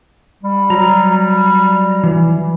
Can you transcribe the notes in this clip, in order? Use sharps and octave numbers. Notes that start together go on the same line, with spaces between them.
G3
F#3 A#5
E3